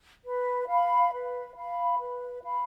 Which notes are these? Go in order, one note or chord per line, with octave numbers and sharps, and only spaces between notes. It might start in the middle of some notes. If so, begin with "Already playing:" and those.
B4
F5 B5
B4
F5 B5
B4
F5 B5